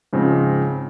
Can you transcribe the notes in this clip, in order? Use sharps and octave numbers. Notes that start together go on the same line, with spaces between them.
G#2 C#3 F3 C4